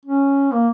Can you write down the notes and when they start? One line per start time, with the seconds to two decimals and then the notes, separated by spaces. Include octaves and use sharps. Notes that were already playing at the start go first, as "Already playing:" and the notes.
0.06 C#4
0.52 A#3